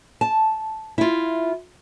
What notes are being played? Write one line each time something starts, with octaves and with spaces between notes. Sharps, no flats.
A5
E4 F4